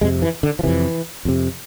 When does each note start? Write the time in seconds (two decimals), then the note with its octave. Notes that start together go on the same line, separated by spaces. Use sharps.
0.01 F2 C3 G#3
0.22 E3
0.43 D3
0.59 F3
0.63 F2 C3 E3
1.25 F2 C3